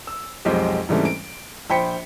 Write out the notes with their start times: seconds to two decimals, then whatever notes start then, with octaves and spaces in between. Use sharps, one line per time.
0.07 E6
0.45 B1 F2 G#3 C4 G4
0.89 G#2 C#3 E3 G3 A3 C4
1.05 D7
1.70 A#1 C5 G5 B5 B6 C#7